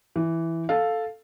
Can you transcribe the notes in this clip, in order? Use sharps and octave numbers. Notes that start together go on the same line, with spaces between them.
E3
A4 F5